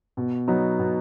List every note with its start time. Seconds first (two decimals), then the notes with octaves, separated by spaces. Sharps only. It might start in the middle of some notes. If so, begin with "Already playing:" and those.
0.17 B2
0.48 F#3 B3 D#4
0.79 B2